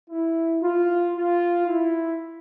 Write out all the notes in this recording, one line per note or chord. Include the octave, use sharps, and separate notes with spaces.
E4
F4
F4
E4